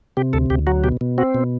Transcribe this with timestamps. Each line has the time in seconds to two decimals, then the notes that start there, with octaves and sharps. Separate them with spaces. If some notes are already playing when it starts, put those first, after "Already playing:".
0.17 C3 G4
0.33 D2 A4
0.50 D2 G4
0.67 F#3 F#4
0.84 B2 G4
1.01 B2
1.18 C4 F#4
1.34 B2